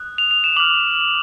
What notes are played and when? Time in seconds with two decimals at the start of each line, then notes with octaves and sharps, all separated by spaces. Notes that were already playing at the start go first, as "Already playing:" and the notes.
Already playing: D#6 F#6
0.18 F7
0.31 F7
0.44 E7
0.56 D6 F6 F#7